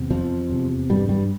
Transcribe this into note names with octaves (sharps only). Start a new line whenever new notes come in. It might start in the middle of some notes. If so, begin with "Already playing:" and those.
Already playing: E2 C3
F2 F3
E2 C3
G2 G3
G2 G3